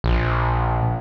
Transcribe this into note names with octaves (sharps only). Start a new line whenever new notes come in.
A#1